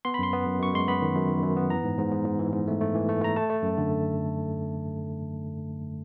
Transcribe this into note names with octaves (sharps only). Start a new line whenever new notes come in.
B3 C6
B5
F#2 C6
B3
F#2
F#2 C#6
G#3 C6
B3 B5
D#3
F#2
D#3
F#2
B3
E3 A#5
G#2
G#2
G#2
G#2
E3
G#2
A3
A3
E3
A3
A3 A#5
A3 A5
A3
F#2
D3